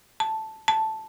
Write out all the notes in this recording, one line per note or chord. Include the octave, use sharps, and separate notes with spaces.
A5
A5